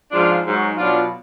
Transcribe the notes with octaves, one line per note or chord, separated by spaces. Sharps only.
G#2 F3 D4 F4
G#2 F#3
B2 F#3 D4 F4